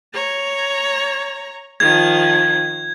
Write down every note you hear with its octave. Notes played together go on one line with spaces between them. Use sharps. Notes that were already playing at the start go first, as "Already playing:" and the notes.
C#5 A#5
D#3 F3 G#6